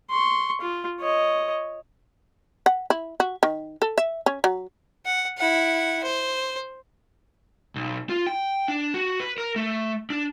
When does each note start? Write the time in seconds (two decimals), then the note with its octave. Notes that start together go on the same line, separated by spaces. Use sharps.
0.11 C6 C#6
0.61 F4
1.00 C#5 D#5
2.66 F#5
2.90 E4
3.20 F#4
3.43 D#3
3.82 A4
3.98 E5
4.26 C#4
4.44 F#3
5.06 F#5
5.38 E4 F#5
6.03 C5
7.76 B1
8.10 F4
8.27 G5
8.68 D4
8.94 F#4
9.20 B4
9.38 A#4
9.56 A3
10.10 D4